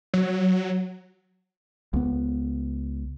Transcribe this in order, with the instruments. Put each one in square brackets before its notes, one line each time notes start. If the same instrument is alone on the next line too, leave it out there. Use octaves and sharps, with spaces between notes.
[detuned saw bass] F#3
[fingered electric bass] C#2 B3